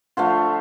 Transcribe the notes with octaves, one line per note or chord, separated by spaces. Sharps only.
D3 F3 A3 F4